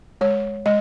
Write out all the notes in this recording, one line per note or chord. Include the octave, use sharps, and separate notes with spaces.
G#3 C#5
G#3 D#5